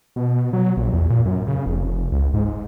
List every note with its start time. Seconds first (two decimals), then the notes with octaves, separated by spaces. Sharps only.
0.16 B2
0.53 F#3
0.77 A#1
0.93 E2
1.10 A#2
1.25 F#2
1.47 C#3
1.66 F1
2.12 C#2
2.34 G#2
2.45 G#2